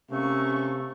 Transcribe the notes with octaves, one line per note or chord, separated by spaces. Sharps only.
C3 A3 A#3 C#4 C#6